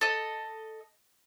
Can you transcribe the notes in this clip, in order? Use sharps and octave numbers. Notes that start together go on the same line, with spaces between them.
A4 D#5